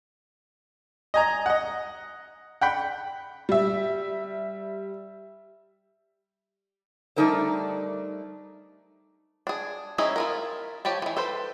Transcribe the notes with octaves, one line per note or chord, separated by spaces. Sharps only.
D#5 G#5 A#5
D#5 F#5
F#5 G5 B5
G3 E5
G3 A3 D4 D#4 A#4 C5
D4 G#4
C4 C#4 D#4 E4 G#4
E4 F4 A#4
F3 G4 C#5 A5
E3 F3
A4 B4 C5